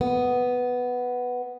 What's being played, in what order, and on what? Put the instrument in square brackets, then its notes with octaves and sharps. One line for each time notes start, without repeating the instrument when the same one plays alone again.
[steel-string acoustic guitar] B3